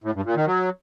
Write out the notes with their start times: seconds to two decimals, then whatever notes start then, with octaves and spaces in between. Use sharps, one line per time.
0.04 A2
0.14 G2
0.25 A#2
0.36 D#3
0.46 F#3